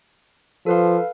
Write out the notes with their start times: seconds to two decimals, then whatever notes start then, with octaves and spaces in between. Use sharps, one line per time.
0.66 F3 A4 B4 F5